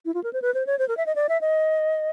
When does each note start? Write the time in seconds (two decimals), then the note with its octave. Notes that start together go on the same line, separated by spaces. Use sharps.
0.05 E4
0.14 F4
0.24 A#4
0.33 C5
0.42 B4
0.54 C5
0.67 C#5
0.79 C5
0.88 A#4
0.97 E5
1.06 D#5
1.16 D5
1.29 E5
1.41 D#5